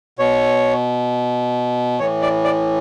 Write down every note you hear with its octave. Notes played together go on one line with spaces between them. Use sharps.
B2 C#5
A2 E3 C#5
D5
D5